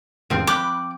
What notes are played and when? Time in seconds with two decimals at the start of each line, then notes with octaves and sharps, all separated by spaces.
0.30 A1 E2 G#2 F3 C4
0.47 G5 B5 D6 F#6